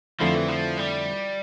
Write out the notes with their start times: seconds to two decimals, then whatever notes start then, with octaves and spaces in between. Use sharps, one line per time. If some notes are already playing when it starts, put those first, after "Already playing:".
0.20 F2 D3 F3 A3 C4 E4
0.35 E3
0.48 F3
0.78 G3